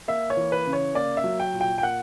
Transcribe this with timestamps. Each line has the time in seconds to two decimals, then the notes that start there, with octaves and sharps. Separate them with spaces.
0.08 A#3 E5
0.30 C#5
0.37 E3
0.52 B4
0.67 C#3
0.73 C#5
0.95 A#3 D5
1.17 E5
1.24 F#3
1.40 G5
1.53 A#2
1.61 G5
1.78 G5
1.82 A#3 F#5